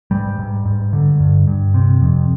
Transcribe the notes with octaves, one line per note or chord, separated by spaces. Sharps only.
G#2 G3
G#2
G#2
D3
G2
G2
C3
F2